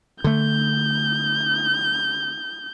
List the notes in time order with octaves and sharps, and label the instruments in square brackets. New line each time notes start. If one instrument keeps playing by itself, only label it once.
[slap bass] D3 A3 [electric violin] G6